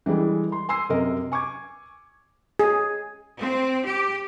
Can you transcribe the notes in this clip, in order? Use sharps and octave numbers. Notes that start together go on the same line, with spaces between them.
E3 G3 G#3 G#4 A4
C6
G#5 C6 E6 C7
F#2 C3 A#4 D#5
G#5 C#6 D6 G#6
G#4
C4
G4